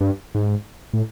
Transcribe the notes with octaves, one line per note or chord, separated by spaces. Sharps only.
G2
G#2
A2